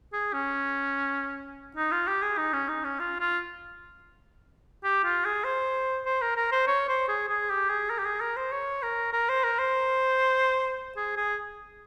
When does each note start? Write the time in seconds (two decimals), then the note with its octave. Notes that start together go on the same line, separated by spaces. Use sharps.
0.13 G#4
0.33 C#4
1.77 D#4
1.91 F4
2.08 G4
2.22 G#4
2.38 D#4
2.53 C#4
2.69 D#4
2.84 C#4
3.00 F4
3.20 F4
4.84 G4
5.04 F4
5.25 G#4
5.44 C5
6.06 C5
6.22 A#4
6.36 A#4
6.52 C5
6.67 C#5
6.88 C5
7.08 G#4
7.29 G#4
7.50 G4
7.69 G#4
7.90 A#4
7.99 G4
8.05 G#4
8.21 A#4
8.37 C5
8.52 C#5
8.83 A#4
9.13 A#4
9.29 C5
9.44 A#4
9.59 C5
10.96 G#4
11.17 G#4